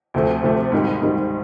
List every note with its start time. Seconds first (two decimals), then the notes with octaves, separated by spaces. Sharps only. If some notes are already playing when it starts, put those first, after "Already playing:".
0.14 D2 C3 F3 A3
0.43 D2 C3 F3 A3
0.72 G#2 D#3 G3
1.02 G#2 D#3 G3